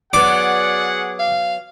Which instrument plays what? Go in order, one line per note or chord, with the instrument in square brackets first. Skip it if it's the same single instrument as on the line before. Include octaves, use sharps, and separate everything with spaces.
[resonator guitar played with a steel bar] F#3 B3 [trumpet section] F#4 G#4 F#5 [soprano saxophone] D5 [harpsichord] D6
[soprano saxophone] F5